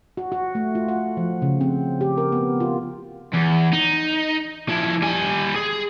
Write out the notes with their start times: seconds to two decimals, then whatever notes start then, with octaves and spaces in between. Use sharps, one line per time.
0.17 F#4
0.32 F#4
0.55 A3
0.75 F4
0.88 F#5
1.17 F3
1.42 C#3
1.61 C4
2.01 G4
2.18 A#4
2.32 B3
2.60 F4
3.33 E2
3.73 D#4
4.68 F3 E4
5.02 G3 G#5
5.56 G#4